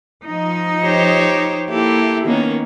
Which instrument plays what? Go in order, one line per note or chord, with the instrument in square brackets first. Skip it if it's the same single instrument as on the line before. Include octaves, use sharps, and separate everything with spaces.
[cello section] F3 D#4
[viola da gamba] G4 C5 C#5
[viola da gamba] A#3 G4 A4 [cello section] E4
[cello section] D#3 [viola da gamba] A#3 B3 C#4